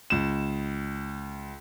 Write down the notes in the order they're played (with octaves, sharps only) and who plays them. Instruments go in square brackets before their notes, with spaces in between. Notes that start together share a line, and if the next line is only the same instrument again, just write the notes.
[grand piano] C#2 E7